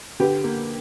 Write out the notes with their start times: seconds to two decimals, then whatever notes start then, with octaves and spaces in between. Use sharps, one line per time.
0.20 D3 G4 B4
0.44 A#3